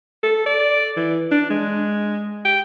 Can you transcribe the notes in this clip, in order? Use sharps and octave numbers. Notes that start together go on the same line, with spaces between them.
A4
D5
E3
D4
G#3
G5